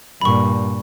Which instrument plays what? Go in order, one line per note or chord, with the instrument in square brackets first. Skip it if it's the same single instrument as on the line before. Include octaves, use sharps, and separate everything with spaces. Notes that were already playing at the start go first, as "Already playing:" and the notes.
[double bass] G2 A#2 [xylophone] B5 C#6